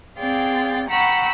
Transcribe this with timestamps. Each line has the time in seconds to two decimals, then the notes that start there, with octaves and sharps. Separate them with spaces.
0.19 C4 G#4 D5 F5 G5
0.89 F#5 G5 A#5 B5 C#6 E6